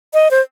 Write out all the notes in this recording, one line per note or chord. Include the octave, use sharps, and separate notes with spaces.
D#5
C5